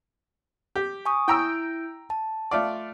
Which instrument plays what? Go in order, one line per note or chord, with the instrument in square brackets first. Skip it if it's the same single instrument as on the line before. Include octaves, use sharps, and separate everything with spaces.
[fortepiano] G4
[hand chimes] G#5 C#6 D#6
[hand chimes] E4 G6 D7 [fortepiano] G5 A#5 E6
[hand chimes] A5
[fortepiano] A3 F4 D5